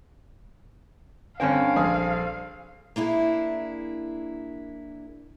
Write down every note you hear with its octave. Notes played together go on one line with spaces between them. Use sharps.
G2 D3 C4 C#4 F5 G5 G#5
A#1 C5 G#5 D#6
A#3 D4 E4 G#4